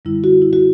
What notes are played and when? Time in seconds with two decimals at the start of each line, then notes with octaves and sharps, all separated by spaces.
0.05 F#2 D3 G3 E4
0.24 F#4
0.42 E4
0.53 F#4